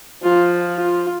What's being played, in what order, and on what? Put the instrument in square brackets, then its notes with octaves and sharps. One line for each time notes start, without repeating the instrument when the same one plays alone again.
[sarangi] F3 [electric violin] F4
[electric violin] F4